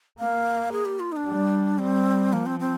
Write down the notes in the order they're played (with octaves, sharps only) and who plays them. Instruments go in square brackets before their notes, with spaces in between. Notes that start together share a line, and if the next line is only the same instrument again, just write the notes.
[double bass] A#3 [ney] F5
[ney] G#4
G4
F4
D#4
D4
[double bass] G3
[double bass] G3 [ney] C4
[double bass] F3 [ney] A#3
[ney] C4
C4